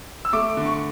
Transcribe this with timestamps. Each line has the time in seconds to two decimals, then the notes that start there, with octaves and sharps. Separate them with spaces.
0.25 E6
0.33 A3 D6
0.50 D6
0.57 D3
0.66 C#6